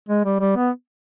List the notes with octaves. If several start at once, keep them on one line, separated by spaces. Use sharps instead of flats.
G#3
G3
G3
B3